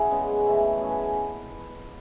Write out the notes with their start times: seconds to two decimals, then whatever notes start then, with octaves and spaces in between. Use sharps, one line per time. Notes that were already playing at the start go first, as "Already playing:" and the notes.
Already playing: C#4 E4 F#4 G#4
0.11 C#3 G#3 B3
0.46 C#3 E3 A3 E4
0.80 F#3 C#4 E4 G#4
0.89 B4